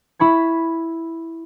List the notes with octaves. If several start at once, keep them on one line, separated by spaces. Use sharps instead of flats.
E4 B5 C#6 G#6